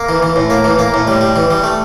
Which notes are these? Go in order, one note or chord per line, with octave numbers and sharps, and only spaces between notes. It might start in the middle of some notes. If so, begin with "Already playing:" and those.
Already playing: A#3
E3
E3
A2
A#3
E3
A#3
A2
G3
G3
E3
G3
A3